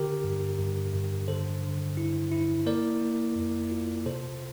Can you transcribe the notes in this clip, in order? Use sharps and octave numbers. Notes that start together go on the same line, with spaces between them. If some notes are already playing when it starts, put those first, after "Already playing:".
Already playing: D3 G4 A#4
G2
G2
G2
D3 A4 C5
D3
E4
E4
A#3 A#4 D5
A#3
F2
F4
C3 A4 C5